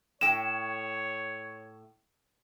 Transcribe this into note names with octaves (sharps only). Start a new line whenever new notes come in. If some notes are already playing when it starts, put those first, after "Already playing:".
A2 C#5 G5 E7